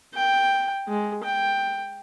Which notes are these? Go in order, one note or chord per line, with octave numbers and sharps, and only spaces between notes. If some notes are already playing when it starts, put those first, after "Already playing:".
G5
G#3
G5